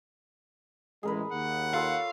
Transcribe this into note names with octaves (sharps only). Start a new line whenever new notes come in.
A1 G#3 G#4 A#4 B4
D#2 F#5
F4 A4 C#5 F5